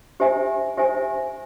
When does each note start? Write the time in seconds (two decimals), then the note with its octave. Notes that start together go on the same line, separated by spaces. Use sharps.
0.20 G4 C5 E5 G#5
0.77 G4 C5 E5 G#5